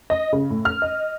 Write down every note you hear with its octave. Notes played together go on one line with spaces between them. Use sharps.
D#5
C#3
A2
F6
D#5